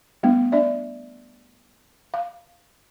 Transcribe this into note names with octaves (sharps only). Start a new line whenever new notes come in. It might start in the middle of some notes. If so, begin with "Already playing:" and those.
G3 A3 B3 D4
D4 D5 E5
F5